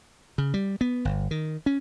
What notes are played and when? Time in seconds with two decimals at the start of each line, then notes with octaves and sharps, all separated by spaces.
0.38 C#3
0.54 G3
0.81 B3
1.05 G1
1.31 D#3
1.66 C#4